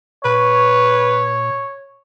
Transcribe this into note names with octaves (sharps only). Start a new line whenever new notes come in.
A#2 B4 C#5